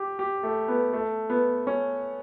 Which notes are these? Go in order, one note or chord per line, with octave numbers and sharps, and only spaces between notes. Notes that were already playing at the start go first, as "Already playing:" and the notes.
Already playing: G4
G4
A3
B3
A3
B3
C#4